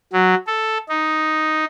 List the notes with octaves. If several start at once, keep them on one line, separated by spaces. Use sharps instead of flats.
F#3
A4
D#4